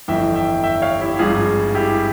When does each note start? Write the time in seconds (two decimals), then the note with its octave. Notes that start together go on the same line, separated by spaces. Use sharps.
0.08 G1 F2 E3 E5 G5
0.35 E5 G5
0.63 E5 G5
0.76 E5
0.82 C#5 F5
1.01 E4 G4
1.19 G#1 G2 F3 F4 G#4
1.74 E4 G4